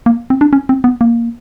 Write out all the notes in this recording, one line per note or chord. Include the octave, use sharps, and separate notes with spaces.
A#3
C4
D4
C#4
C4
B3
A#3